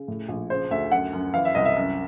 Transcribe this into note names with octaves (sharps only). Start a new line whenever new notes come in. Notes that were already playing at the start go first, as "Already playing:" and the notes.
Already playing: C#3
A2
A#1
C#3 C5
D2 E5
F#2 F#5
F#2
E3 F5
E5
C2 D#5
E5
F#2